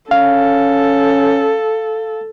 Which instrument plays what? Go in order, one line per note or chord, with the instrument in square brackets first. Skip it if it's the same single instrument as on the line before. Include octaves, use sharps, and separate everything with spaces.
[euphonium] C#4 [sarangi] A4 [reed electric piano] F5